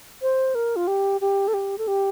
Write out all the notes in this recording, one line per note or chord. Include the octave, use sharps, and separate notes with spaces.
C5
A#4
F4
G4
G4
A4
G4
A4
G4